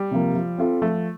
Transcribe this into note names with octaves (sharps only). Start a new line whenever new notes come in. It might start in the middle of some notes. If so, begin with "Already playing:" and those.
Already playing: G3
C3 F3 A#3
F3
C4 F4 A4
F3 A3